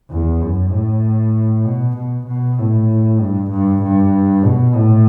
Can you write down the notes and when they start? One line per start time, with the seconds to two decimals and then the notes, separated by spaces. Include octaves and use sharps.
0.10 E2
0.41 F#2
0.72 A2
1.65 B2
1.97 B2
2.27 B2
2.58 A2
3.20 G2
3.51 G2
3.83 G2
4.45 B2
4.75 A2